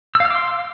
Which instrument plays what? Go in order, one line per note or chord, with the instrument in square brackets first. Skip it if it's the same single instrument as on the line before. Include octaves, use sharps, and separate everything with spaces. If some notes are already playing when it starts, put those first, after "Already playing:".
[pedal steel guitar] E6
F5
F6
D6
C6